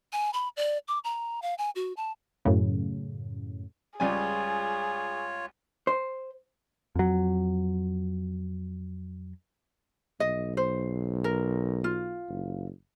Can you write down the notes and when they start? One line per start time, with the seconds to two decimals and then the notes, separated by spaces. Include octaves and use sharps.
0.13 G#5
0.33 B5
0.57 D5
0.88 D6
1.04 A#5
1.42 F5
1.58 G#5
1.75 F#4
1.97 A5
2.45 F#2 A2 C#3
4.00 C#2 G3 F4 G#4 C#5 G#5
5.87 C5
6.95 F2 F#3
10.20 B1 D#5
10.57 C5
11.24 A#4
11.84 F4
12.29 F#1